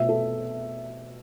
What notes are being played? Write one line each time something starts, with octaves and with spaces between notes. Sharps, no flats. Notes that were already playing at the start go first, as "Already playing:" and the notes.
Already playing: B2 A3 E5
A4